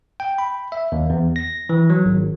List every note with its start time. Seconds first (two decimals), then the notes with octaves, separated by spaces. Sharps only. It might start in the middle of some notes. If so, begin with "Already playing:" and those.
0.20 G5
0.38 B5
0.72 E5
0.92 D#2
1.10 E2
1.36 A#6
1.69 E3
1.90 F#3
2.05 G#1